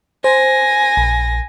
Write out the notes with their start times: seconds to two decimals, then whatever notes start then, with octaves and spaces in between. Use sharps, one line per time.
0.24 C5 G#5 A#6
0.97 A#1